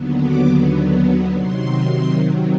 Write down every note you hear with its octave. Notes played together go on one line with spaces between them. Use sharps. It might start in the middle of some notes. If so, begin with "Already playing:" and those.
Already playing: D#2 D3 F#3 B3
D6
C3 D#3 F#3 C6